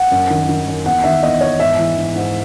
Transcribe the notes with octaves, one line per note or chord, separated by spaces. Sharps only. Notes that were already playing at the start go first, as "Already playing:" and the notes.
Already playing: F#5
F#2
D#3
D#3
F#2
E2 F#5
D#3 E5
E2 D#5
E2 C#5
G#2 E5
E3
G#2
G#2